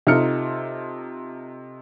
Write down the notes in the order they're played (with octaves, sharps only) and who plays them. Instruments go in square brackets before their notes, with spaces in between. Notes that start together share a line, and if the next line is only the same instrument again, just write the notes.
[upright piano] C3 D#4 F4 A4 F6 C#7